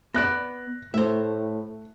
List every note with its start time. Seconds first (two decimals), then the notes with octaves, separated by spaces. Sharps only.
0.14 B3 D5 F#6 A#6
0.94 A2 A3 C5 E5